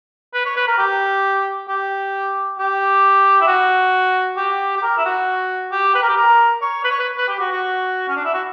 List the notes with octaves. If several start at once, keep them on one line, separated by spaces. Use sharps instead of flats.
B4
C#5
B4
A#4
G4
G4
G4
E4
F#4
G4
G4
A#4
E4
F#4
G4
B4
A#4
G4
A#4
C#5
B4
C#5
B4
B4
G4
F#4
F#4
C#4
D4
E4
F#4